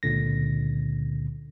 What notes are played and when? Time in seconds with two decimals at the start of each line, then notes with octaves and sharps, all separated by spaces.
0.03 C#2 A#2 D3 A#6